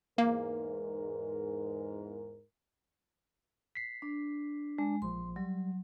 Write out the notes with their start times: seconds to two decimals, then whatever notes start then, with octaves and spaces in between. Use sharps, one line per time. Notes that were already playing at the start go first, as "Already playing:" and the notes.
0.18 E2 G#2 A#3 A#4
3.75 B6 C7
4.02 D4
4.78 G#3 D4
5.02 A#1 F3 C6
5.36 F#3 G3